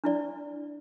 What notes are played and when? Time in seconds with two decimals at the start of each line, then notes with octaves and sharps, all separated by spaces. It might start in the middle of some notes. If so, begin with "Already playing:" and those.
0.04 D4 E4 D5